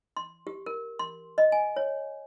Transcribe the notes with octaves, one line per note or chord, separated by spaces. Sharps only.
C6
G4
A#4
C6
D#5
G#5
C#5